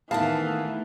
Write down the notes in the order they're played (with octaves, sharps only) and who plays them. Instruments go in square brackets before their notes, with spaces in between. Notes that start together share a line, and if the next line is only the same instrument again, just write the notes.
[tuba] A2 [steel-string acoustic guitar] D#3 B3 G#4 [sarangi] E3 [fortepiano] F5 A5
[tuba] A3